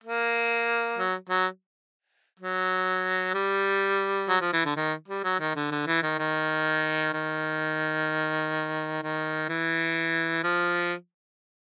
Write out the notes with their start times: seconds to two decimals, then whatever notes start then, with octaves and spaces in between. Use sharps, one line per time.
0.04 A#3
0.98 F#3
1.29 F#3
2.39 F#3
3.34 G3
4.28 F#3
4.41 F3
4.53 E3
4.65 D3
4.76 D#3
5.08 G3
5.24 F#3
5.39 D#3
5.55 D3
5.71 D3
5.86 E3
6.02 D#3
6.18 D#3
7.13 D#3
9.02 D#3
9.49 E3
10.44 F3